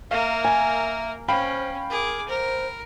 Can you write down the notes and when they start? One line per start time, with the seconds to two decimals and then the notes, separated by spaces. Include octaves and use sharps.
0.11 A#3 A#4 E5 F5
0.44 G#5
1.28 C#4 C5 F5 G5 B5
1.90 G#4 A#4 D6
2.29 A#4 C5